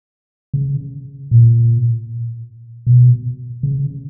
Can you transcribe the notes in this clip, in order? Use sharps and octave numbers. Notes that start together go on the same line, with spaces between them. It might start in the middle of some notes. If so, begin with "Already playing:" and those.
C#3
A#2
B2
C#3